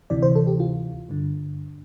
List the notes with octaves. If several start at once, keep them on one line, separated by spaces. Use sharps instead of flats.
D2 C3 E3 D5
C5
A4
G4
F4
G2 D3